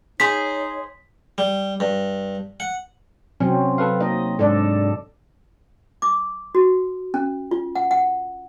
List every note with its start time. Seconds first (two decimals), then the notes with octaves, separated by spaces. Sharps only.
0.20 D#4 G#4 C5 C#5 B6
1.38 G3
1.80 G2
2.60 F#5
3.40 C3 F#3 C4 C#4
3.78 A4 B4 F5
4.01 A#3 D#4 D#5
4.39 G#2 D4 A4 D5
6.02 D6
6.55 F#4
7.14 C#4
7.51 F4
7.75 F#5
7.91 F#5